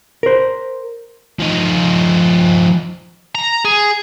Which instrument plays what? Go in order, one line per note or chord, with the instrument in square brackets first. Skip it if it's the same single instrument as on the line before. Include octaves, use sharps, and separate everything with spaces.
[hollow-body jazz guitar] A#4 C5
[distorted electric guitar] F3 D#4
A#5
G#4